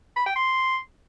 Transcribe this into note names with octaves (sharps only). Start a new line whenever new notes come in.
B5
G5
C6